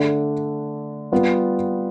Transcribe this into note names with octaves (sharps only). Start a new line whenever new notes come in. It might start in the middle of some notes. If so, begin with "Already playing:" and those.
Already playing: D3 A3 D4
G3 B3 F4